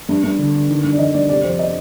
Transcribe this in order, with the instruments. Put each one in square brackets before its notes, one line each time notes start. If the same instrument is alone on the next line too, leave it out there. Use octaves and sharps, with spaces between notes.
[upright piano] G2
G2
D3
D3
D#3
G2
D5
D#3 D#5
G2 D5
C3 D5
F2 C5
D#5